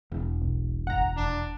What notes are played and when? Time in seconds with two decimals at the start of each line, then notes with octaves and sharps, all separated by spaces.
0.12 E1 E2
0.42 B1
0.87 G1 F#5 A#5
1.17 F1 D4